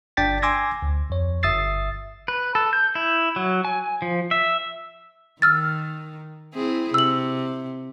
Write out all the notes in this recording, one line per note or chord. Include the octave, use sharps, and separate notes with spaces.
G1 D4 D5 G5 A6 B6
G#5 C6 D6 E6 G#6 A#6
D2
F2 C#5
G1 E5 D#6 E6 A6 C7
B4
A4
G6
E4
F#3
G#5
F3
E5
D#3 E6 F6 A6
C4 E4 G#4
C3 E6 F#7